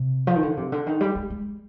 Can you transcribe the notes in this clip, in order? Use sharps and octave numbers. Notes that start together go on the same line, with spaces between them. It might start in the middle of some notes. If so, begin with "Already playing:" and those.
Already playing: C3
F3
D#3
D3
C3
D3
D#3
G3
G#3
G#3